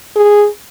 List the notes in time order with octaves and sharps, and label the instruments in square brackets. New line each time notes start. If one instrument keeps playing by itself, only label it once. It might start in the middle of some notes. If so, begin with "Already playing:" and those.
[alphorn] G#4